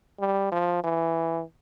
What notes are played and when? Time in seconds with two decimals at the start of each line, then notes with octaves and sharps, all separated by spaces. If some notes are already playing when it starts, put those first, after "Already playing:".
0.20 G3
0.52 F3
0.84 E3